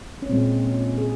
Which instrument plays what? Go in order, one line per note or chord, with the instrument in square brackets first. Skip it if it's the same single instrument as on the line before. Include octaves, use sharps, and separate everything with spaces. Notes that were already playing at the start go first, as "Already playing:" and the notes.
[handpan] C#4
A#2 G#3 C4
C#4
G#4